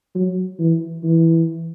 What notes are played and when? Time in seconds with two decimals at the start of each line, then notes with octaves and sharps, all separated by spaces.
0.15 F#3
0.59 E3
1.03 E3